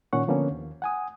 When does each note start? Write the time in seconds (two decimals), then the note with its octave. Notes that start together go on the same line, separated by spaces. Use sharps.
0.13 A#2 D#3 C#4 F#5 C#6
0.28 D3 F3 A#3 B3 C#4
0.51 D#2
0.82 F#5 G#5 D#6